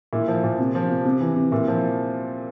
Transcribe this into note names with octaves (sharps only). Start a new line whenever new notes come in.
A#2 E4
F3
A#2
C3
F3
C3
C3
E3
C3
A#2 E4
F3